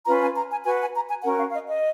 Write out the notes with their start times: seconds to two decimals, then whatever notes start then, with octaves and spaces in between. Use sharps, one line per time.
0.06 C#4 F4 B4 A#5
0.21 G#5
0.35 A#5
0.51 G#5
0.65 F#4 B4 G#5
0.80 G#5
0.95 A#5
1.10 G#5
1.23 C#4 F#4 A#4 F#5
1.38 F5
1.49 F5
1.53 D#5
1.68 D#5